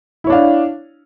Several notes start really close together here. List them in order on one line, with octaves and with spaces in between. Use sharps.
E4 C#5 D4 F5